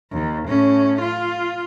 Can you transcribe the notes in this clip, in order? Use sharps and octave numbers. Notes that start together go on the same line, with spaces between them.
D#2
A2 C#4
F4